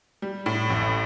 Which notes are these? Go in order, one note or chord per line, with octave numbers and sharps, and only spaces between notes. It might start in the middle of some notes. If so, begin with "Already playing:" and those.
G3
A2
A1